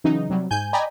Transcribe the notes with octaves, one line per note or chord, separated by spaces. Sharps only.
C#3 E3 F#3 D#4
C3 F#3 G3
G#2 G#5 G6
D5 D#5 G5 G#5 A#5 B5